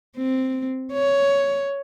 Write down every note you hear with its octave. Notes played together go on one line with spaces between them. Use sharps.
C4
C#5